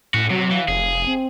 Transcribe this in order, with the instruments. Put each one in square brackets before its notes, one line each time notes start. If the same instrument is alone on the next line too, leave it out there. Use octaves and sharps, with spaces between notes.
[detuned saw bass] A2 [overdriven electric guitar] C#4 F#4
[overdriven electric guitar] C3 [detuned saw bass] F#3
[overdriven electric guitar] E3 [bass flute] F5
[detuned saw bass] F1 [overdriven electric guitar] G#4
[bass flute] C4